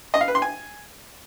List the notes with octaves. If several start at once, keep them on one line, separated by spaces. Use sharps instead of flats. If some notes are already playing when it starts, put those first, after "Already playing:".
D#5
F5
B4
C6
G#5